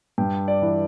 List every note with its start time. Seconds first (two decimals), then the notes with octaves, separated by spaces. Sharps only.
0.18 G2 G5
0.48 D5
0.62 E3